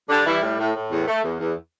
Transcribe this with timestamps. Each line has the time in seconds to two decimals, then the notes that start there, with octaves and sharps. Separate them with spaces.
0.09 D3 G3 D4
0.26 E3 G3 E4
0.42 A2
0.59 A2
0.75 A2
0.91 E2
1.07 A3
1.24 E2
1.40 E2